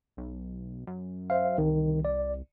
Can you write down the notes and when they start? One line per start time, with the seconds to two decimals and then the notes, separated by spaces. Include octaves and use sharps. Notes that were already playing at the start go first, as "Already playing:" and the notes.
0.17 B1
0.87 F#2
1.30 C5 E5 F5
1.58 C2 D#3
2.05 D5